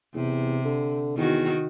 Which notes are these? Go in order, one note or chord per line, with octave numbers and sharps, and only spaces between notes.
E2 C3
D3
E2 D#3 F#4